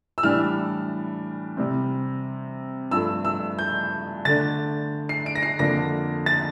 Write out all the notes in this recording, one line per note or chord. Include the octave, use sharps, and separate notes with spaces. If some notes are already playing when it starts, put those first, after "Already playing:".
E6
A2 E3 G3 D4 F6
C3 G3 C4
G2 F3 A3 E6
E6
G6
D3 A3 D4 A6
C7
D7
A#6
C7
F2 D3 F3 A#3 D4 A#6
A6